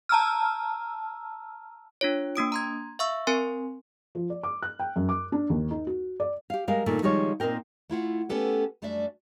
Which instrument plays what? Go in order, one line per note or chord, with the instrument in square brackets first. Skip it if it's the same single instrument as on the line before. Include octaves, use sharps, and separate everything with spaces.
[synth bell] A5 A#5 E6 F6
[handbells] D4 F4 C#5
A#3 D4 D#6 D7
A#5 C6 G#6
E5 F5 C#6 E6
C4 A#4 G#5 C6
[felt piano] F3
D5
D6
F#6
G5
F#2
D6
D4
D#2
D#4
F#4
D5
[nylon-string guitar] G4 F5
G3 G#3 A#4 F5
A#2 D#3 A3 A#3
D#3 F3 G3 G#3 F4 C#5
A#2 C4 D#4 A#4 G5
[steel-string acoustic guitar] A3 E4 F4 F#5
A3 B3 C#4 G4 A4 B4
F#2 G3 A3 D4 D5 E5